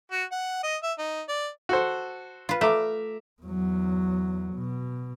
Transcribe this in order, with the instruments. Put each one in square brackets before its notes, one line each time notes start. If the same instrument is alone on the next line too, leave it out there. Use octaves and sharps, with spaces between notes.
[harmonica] F#4
F#5
D#5
E5
D#4
D5
[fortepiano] F#4 A4 C5
[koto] F4 B4
[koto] A3 [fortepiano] E5 A#5 D6
[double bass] E2 F#3
B2